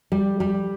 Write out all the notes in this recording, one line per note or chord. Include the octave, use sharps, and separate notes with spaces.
G3
G3